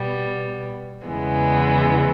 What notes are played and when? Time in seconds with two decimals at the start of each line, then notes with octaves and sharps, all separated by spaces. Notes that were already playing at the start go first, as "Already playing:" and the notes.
Already playing: B2 G3 B3
1.06 E2 C#3 E3 G#3 B3